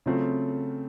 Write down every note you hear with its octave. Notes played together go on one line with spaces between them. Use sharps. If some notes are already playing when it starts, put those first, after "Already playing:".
C#3 F#3 A3 C4 F4